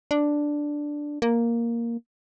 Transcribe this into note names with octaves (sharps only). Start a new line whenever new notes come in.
D4
A#3